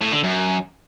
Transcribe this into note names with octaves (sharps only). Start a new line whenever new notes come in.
A2
D3
F#2